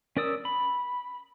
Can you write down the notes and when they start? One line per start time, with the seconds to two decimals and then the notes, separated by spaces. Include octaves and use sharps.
0.17 C#4 A#4 D5 D#6 E6
0.45 B5